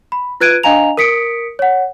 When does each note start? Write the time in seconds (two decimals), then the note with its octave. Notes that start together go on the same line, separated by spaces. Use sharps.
0.12 B5
0.40 F4 B4 F#6 G#6 D7 D#7
0.63 D4 D#5 F5 G#5 A#5 F7
0.97 A#4 D#6 B6 C#7 D7
1.59 C#5 F#5